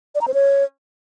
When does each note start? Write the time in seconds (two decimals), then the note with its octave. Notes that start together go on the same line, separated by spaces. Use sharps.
0.15 D5
0.21 A#5
0.28 C5
0.34 C#5